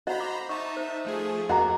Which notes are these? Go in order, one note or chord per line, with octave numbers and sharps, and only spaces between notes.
F#4 C5 D#5 F#5 A#5 B5
D6
D#4 E5 A5 C#6
C5
F3 A3 G#4
F2 A#3 F#4 D#5 F#5 A#5